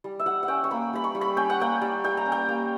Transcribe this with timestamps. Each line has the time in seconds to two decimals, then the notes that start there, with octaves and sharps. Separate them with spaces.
0.04 G3
0.19 E5
0.26 G3 F#5
0.43 F#5
0.48 C#4 G5
0.64 C#6
0.71 A#3 B5
0.93 G3 B5
1.04 C#6
1.15 G3
1.21 B5
1.37 C#4 G5
1.50 F#5
1.60 A#3 G5
1.81 G3
2.04 G3 G5
2.17 A#5
2.26 C#4
2.32 G5
2.48 A#3